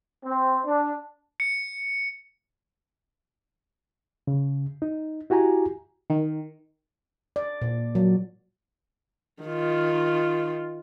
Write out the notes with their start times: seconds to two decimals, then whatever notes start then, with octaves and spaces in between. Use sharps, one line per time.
0.24 C4
0.65 D4
1.40 C#7
4.27 C#3
4.82 D#4
5.30 E4 F#4 G4 G#5 A#5
6.10 D#3
7.36 D5
7.62 A#2
7.95 F#3
9.43 D#3 F4